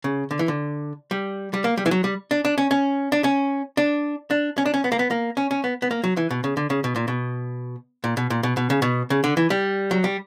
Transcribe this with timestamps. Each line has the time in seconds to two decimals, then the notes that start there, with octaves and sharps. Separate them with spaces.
0.04 C#3
0.31 D3
0.39 E3
0.48 D3
1.11 G3
1.54 G3
1.64 A#3
1.77 G3
1.86 E3
1.91 F#3
2.04 G3
2.31 D4
2.45 D4
2.58 C#4
2.71 C#4
3.12 D4
3.24 C#4
3.77 D4
4.31 D4
4.58 C#4
4.66 D4
4.74 C#4
4.84 B3
4.92 A#3
4.99 B3
5.11 A#3
5.37 C#4
5.51 C#4
5.64 B3
5.82 B3
5.91 A#3
6.04 F#3
6.17 E3
6.31 B2
6.44 C#3
6.57 D3
6.70 C#3
6.84 B2
6.96 A#2
7.08 B2
8.04 A#2
8.17 B2
8.30 A#2
8.43 B2
8.57 B2
8.70 C#3
8.82 B2
9.10 C#3
9.24 D3
9.37 E3
9.50 G3
9.91 F#3
10.04 G3